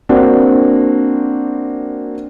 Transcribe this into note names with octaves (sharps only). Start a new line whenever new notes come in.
A#3 C4 D4 F#4